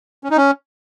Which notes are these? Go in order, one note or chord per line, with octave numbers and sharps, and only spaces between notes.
C#4
D#4
C#4